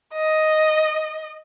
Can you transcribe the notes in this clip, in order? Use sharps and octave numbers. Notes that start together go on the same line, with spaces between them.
D#5